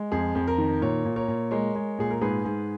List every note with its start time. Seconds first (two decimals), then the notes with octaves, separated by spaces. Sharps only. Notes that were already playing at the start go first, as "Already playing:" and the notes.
Already playing: G#3
0.12 F2 G#4
0.35 F2
0.47 A#4
0.58 D#3
0.82 A#2 A#4 C#5
1.05 A#2
1.16 A#4 C#5
1.28 A#2
1.51 G#3 A#4 C#5
1.75 G#3
1.99 A#2 G#4
2.11 A#4
2.21 G#2 G#4 B4
2.45 G#2